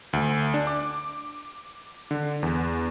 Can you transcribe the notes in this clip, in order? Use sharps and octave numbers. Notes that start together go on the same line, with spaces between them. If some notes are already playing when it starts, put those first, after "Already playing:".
D2
D4
D6
D3
E2